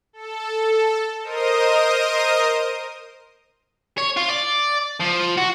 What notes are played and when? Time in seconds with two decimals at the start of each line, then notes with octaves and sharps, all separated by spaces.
0.13 A4
1.22 A#4 C5 D#5 D#6
3.98 C#5
4.17 F4
4.29 D5
5.00 F3
5.38 F#4